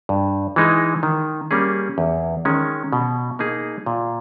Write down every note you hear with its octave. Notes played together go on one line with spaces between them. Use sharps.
G2
E3 G#3 D#4
D#3
G3 A#3 C#4 G#4
E2
D#3 G#3 C#4
B2
A#3 D#4 G#4
A#2